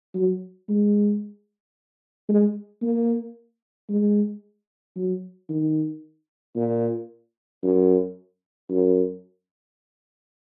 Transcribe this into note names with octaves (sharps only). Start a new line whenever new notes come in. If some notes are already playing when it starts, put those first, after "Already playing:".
F#3
G#3
G#3
A#3
G#3
F#3
D#3
A#2
F#2
F#2